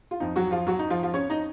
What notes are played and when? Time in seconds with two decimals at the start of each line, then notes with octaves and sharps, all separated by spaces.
0.11 F4
0.20 F2 F3 D#4
0.36 F#3 F#4
0.51 F3 F4
0.67 F#3 F#4
0.79 D#4
0.90 F3 F4
1.03 F3 F4
1.14 C#4 C#5
1.30 D#4 D#5